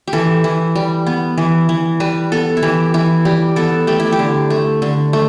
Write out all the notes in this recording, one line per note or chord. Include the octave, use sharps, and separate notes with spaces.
G4
E3 A4
E3
G3
B3
E3
E3
G3 B4
B3 A4
E4
E3 G4
E3 E4
G3 G4
B3 A4
A3 G4
E4
G4
D3
A3
D3
A3